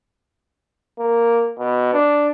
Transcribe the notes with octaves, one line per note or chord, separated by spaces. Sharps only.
A#3
B2
D4